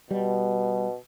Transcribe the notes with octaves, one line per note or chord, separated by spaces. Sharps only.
B2 G3